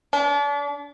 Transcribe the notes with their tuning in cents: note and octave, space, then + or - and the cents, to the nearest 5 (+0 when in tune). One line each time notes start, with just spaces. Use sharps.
D4 -40